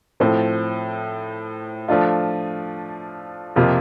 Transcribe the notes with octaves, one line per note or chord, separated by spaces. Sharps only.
A2 F3 C4
F3 A3 D4 F4
F2 C3 F3 A#3 F4